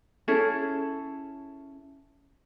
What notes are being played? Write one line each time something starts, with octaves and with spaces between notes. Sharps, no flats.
C#4 E4 G#4 A4